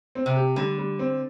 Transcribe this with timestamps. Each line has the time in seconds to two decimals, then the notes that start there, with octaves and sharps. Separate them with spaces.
0.15 C4
0.26 C3
0.36 G4
0.56 D3 G3
0.78 G3
0.99 C4